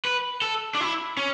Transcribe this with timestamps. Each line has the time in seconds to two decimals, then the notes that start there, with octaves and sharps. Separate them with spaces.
0.05 B4
0.42 A4
0.75 D4
0.80 E4
1.17 C#4